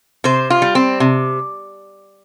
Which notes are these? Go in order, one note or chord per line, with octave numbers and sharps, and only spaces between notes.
C3 C5
F4
G3
C4
C3